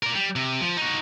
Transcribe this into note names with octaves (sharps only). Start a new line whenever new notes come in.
A#4 D5
G3
C3
F3
D#4 F#4